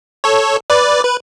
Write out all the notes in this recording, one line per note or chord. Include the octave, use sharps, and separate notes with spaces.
A4 C#5
B4 D5
B4